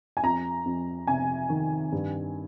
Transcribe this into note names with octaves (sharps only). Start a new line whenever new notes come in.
G#5
F2 A#5
F2
C3 G#5
D#3
G2